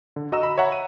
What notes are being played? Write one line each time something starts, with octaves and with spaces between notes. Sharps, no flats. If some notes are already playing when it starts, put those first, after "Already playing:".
D3
F#4 D#5 A#5 E6 E7
B5
C#5 E5 F#5 A#5
D#7